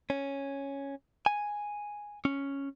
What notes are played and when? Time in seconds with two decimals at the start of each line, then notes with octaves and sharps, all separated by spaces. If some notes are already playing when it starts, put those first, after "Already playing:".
0.10 C#4
1.26 G#5
2.25 C#4